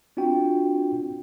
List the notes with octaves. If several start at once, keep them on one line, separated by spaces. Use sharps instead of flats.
C4 D4 F4 F#4 G5